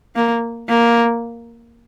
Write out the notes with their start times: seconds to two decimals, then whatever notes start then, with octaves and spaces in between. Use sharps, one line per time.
0.15 A#3
0.69 A#3